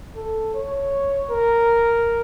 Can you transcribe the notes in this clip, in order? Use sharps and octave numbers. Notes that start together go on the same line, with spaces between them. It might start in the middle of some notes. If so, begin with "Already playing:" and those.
A4
C#5
A#4